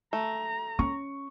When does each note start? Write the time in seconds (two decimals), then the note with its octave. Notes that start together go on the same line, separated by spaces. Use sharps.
0.13 A3 A#5
0.79 C#4 C#6